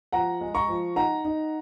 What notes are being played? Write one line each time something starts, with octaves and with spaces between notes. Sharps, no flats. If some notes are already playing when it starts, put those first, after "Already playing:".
F3 F#5 A#5
G#3
A#5 C#6
F3
D#4 F#5 A#5
D#4